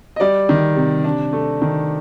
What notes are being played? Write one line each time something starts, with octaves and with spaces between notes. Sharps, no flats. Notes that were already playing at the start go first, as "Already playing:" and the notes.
D#5
G3 D5
D#3
C3
D4
A3
D#3